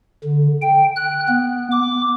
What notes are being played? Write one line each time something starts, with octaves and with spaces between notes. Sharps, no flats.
D3
G5
F#6
B3
D6